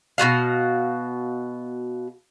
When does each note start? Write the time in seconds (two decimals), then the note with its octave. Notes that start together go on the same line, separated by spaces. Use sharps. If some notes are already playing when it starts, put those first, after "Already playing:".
0.18 B2 F4 F#4 F5